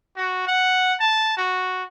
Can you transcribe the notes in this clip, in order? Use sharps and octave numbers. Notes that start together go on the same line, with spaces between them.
F#4
F#5
A5
F#4